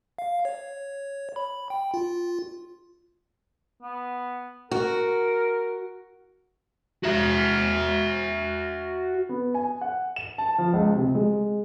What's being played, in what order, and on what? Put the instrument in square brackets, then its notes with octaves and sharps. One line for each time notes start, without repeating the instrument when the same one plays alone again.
[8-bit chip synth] F5
C#5
B5
G5
F4
[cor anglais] B3
[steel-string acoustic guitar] F#4 [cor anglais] A#4
[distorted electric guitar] F#4 E5
[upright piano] B3
G#5
F#5
E7
A5
F3
C#2
C3
G#3